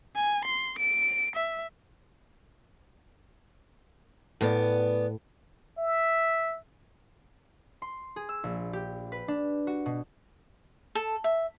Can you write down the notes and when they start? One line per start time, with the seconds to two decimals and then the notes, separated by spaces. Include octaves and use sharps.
0.16 G#5
0.45 C6
0.79 D7
1.36 E5
4.41 E2 A2 B3 D5
5.78 E5
7.82 C6
8.16 G#4
8.29 E6
8.44 A#1
8.73 G4
9.12 B4
9.28 D4
9.67 F#4
9.86 B2
10.95 A4
11.24 E5